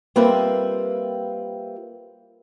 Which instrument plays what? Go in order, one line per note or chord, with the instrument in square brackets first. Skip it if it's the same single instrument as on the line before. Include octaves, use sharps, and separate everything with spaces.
[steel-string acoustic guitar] G3 A#3 C4 F4 B4 E5